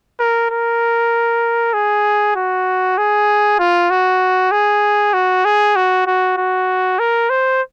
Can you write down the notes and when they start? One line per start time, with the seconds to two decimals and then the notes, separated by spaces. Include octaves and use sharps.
0.20 A#4
0.51 A#4
1.74 G#4
2.36 F#4
2.98 G#4
3.59 F4
3.90 F#4
4.51 G#4
5.13 F#4
5.45 G#4
5.76 F#4
6.07 F#4
6.37 F#4
6.99 A#4
7.30 C5